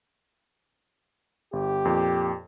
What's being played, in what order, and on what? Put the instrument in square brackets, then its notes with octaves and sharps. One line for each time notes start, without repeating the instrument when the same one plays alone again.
[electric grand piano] G1 [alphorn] G4
[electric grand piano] F2 A#2